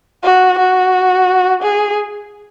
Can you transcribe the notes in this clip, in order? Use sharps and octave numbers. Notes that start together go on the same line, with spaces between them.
F#4
F#4
G#4